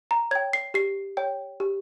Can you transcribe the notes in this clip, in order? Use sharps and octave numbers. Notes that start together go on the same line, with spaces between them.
A#5
C#5 G5 G#6
C7
G4 C7
C#5 G5
G4